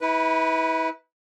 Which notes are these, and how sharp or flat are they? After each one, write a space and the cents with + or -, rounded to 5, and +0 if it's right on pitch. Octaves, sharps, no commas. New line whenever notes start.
E4 -35 B4 +0